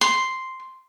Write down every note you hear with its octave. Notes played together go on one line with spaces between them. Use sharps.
C6